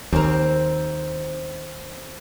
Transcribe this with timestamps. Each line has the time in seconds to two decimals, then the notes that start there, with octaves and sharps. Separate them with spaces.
0.12 D#2 C4 A#4